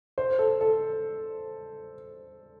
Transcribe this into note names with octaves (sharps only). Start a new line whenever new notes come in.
C5
A4
A4